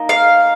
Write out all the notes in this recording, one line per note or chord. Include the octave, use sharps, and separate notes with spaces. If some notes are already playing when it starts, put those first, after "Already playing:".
Already playing: A#3 D#4
F5